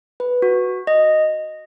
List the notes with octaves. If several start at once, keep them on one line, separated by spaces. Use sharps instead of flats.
B4
F#4
D#5